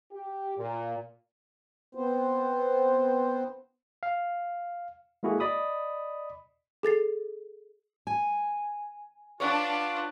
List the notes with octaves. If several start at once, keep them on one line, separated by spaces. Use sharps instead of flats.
G4
A#2
B3 C4 C5
F5
G#3 A#3 E4 F#4 G#4 A4
D5 D#5 B5 D#6
G#4 A4 A6 C7
G#5
D4 F4 B4 C#5 F#5